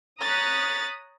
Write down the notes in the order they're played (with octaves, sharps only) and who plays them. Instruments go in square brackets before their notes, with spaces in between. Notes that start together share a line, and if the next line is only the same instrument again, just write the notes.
[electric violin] C#5 A#5 [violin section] D#6 F#6 B6 [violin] A6